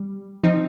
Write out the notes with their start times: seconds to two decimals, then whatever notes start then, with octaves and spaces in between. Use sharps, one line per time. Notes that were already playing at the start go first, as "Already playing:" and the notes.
Already playing: G3
0.43 F3 C4 D#4